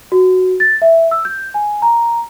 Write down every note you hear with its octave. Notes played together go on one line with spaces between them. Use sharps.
F#4
A6
E5
E6
G6
G#5
A#5